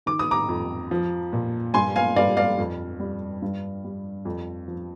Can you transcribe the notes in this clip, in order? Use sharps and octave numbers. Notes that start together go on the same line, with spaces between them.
D#3 D6
D#6
A#5 D6
F2
F3
A#2
G2 G#5 C6
F5 G#5
G2 D5 F5
D5 F5
F2
G3
G2
G3
F2
F3